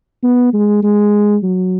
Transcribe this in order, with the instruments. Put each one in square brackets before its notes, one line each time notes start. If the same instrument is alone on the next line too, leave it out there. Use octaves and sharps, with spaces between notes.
[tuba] B3
G#3
G#3
F#3